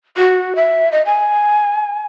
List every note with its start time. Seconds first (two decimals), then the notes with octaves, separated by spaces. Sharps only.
0.17 F#4
0.56 E5
0.92 D#5
1.06 G#5